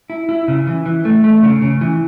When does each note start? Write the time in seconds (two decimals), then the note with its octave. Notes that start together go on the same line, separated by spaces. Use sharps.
0.10 E4
0.29 E4
0.48 C#3
0.67 E3
0.86 E3
1.05 A3
1.24 A3
1.43 C#3
1.62 C#3
1.81 E3